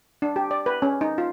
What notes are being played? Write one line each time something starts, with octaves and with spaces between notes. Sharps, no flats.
D4
G4
D5
B4
C#4
D#4
F4